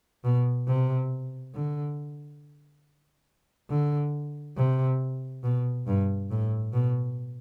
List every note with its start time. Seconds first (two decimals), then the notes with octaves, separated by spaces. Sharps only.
0.24 B2
0.67 C3
1.54 D3
3.70 D3
4.57 C3
5.44 B2
5.87 G2
6.30 A2
6.73 B2